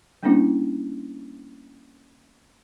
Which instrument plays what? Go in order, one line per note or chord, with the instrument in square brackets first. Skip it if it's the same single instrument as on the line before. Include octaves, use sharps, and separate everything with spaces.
[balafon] G3 A#3 B3 C#4 D4 E4